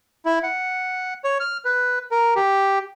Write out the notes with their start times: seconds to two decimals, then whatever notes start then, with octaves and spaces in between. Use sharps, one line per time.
0.25 E4
0.43 F#5
1.24 C#5
1.40 F6
1.65 B4
2.11 A#4
2.36 G4